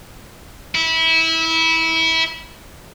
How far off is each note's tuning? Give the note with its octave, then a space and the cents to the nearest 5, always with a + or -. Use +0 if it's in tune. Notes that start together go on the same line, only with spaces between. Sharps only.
E4 -20